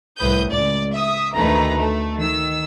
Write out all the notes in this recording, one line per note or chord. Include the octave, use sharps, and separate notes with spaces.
C2 A2 B4 D#6 G6
C#2 D5
E5 D#6
D2 D#3 A3 B4 A#5
A3
D#3 E6